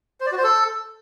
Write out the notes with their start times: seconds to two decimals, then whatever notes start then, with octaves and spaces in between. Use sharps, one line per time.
0.20 C5
0.26 D5
0.32 F#4
0.38 C5
0.44 A4